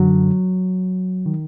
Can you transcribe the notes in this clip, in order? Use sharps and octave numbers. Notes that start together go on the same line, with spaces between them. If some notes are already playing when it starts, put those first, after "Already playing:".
Already playing: F#2 D3 F#3
D#3